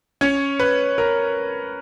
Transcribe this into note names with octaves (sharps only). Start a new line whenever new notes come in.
C#4 C#5
B4
A#4